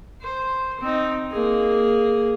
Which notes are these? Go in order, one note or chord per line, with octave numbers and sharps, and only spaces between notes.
C5
C4 D#4
A#3 G#4